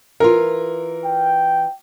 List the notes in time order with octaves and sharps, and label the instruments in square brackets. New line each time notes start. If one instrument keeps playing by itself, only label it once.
[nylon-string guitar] E3 F4 [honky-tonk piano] A#4
[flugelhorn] G5